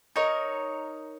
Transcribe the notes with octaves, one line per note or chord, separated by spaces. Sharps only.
D#4 A#4 C#5